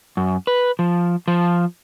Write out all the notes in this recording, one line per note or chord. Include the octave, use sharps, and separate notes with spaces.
F#2
B4
F3
F3